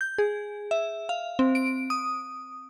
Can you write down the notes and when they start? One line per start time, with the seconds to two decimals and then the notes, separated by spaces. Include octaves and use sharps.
0.01 G6
0.18 G#4
0.71 E5
1.09 F5
1.39 C4
1.55 D7
1.90 D#6